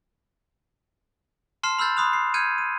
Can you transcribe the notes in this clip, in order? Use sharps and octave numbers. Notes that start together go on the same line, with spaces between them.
A5 C6 F6 C7 E7
B5 E6 F6 G6 A6
B5 C6 D#6 F#6 F7
C7
F6 G6 G#6 C#7 D#7
D#7